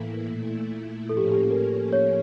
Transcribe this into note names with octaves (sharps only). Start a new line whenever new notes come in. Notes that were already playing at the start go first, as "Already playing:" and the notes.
Already playing: A2 E3 A#3 E4 A4
A#2 A3 E4
A2 F3 A#3 C#4 A4
G4
G4
A#4
C#5